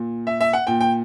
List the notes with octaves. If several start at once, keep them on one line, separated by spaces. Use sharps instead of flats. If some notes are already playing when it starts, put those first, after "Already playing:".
Already playing: A#2
E5
E5
F#5
A#2 G5
G5